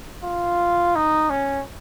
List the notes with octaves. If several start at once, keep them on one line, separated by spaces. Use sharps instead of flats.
F4
D#4
C#4